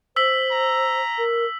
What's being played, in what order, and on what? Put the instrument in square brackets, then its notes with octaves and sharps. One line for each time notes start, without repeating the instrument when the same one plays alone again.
[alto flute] C5 [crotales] E6 B6 F#7
[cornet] A#5
[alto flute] A#4